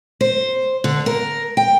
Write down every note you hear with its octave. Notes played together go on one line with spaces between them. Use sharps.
C5
D3
A#4
G5